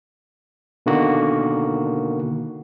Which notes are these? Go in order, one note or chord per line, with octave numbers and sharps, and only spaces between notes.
B2 D3 D#3 A#3 F#4